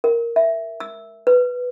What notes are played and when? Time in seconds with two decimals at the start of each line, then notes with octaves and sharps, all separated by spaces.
0.04 A#4
0.36 E5
0.80 E6
1.27 B4